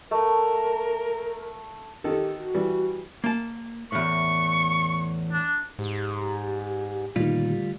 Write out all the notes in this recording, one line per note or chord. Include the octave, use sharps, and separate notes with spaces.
A3 A#4
D#3 G4 A4
F#4
E3 G3
A#3 A5
E2 A2 C#6
D4
G#2 G4
D2 A#2 D#3 G3 F4